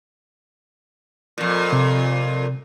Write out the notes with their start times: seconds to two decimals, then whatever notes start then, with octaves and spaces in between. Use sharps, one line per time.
1.38 F2 A#2
1.73 C3